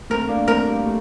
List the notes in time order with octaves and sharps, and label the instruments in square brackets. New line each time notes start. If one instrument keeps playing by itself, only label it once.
[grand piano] A3 C4 [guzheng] A#4
[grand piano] A#3 D4
[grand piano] A3 C4 [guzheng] A#4
[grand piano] G3 A#3
A3